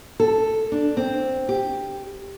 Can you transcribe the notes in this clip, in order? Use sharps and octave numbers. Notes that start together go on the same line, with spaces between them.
A4
D4
C4
G4